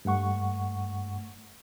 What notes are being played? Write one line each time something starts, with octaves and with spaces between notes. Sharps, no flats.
G2 A3 F#5 C#6